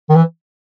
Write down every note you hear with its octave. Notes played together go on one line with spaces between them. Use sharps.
D#3
E3